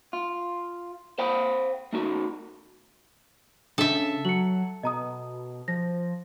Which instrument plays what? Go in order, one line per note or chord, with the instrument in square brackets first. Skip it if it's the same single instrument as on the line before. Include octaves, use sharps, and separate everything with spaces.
[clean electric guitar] F4
C5 F5 G5 B5
A3 D#4 F#4
[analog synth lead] C#3 [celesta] D4 [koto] A4 E5
[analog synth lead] F#3 [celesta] C#7 F#7
[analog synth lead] B2 [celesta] D#5 A#5 D#6
[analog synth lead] F3 [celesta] A#6